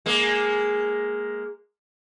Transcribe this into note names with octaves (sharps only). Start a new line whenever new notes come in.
G#3 A#3